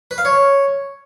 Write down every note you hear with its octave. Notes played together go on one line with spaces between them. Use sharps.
B4
F5
C#5